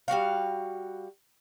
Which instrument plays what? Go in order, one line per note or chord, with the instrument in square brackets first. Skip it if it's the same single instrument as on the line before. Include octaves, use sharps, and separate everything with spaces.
[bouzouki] G3 B3 F#4 F5